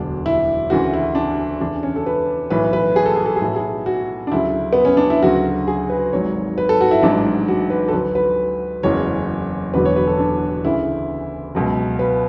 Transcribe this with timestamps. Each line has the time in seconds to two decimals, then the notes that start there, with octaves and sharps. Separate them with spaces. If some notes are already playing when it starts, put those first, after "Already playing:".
Already playing: E1 D2 D3 F#3 D4
0.26 E4
0.70 D2 C#3 E3 F#4
0.93 E4
1.15 D4
1.61 E2 C#3 E3 D4
1.83 C#4
1.96 A4
2.06 B4
2.50 B1 A2 E3 B4
2.73 B4
2.96 G#4
3.06 A4
3.16 G#4
3.26 A4
3.36 G#4
3.41 B1 A2 F#3 A4
3.56 G#4
3.86 F#4
4.27 D4
4.32 D2 C#3 F#3 E4
4.73 B3
4.85 C#4
4.97 D4
5.10 E4
5.23 D2 C#3 F#3 F#4
5.67 G#4
5.89 B4
6.13 G#1 G#2 F#3 C#5
6.58 B4
6.69 A4
6.81 F#4
6.91 E4
7.02 A1 G#2 F#3 D4
7.48 F#4
7.70 B4
7.88 A4
7.93 D2 D3 F#3 B4
8.15 B4
8.83 F#1 E2 C#3 F#3 C#5
9.74 E1 E2 D3 F#3 B4
9.85 C#5
9.96 B4
10.08 A4
10.19 D4
10.65 D2 C#3 E3 E4
11.55 C#2 B2 F#3
11.99 B4